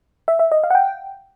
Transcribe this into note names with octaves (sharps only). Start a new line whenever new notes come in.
E5
E5
D#5
F5
F#5
G5